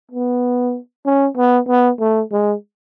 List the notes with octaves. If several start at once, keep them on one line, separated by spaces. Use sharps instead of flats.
B3
C#4
B3
B3
A3
G#3